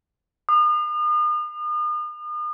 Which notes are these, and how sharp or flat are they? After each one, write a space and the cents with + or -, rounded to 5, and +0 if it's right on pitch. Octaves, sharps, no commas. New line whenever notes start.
D#6 -40